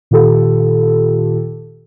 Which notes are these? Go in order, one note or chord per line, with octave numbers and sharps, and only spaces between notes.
A#2 D#3 F4 G4 A4